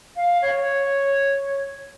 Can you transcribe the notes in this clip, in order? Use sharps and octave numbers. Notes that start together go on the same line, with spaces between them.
F5
C#5